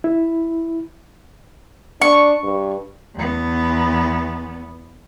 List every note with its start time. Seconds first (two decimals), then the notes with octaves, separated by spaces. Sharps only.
0.04 E4
2.02 D4 C#6
2.44 G2
3.15 E2 B3